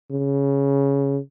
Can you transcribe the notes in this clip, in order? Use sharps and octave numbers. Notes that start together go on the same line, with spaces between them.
C#3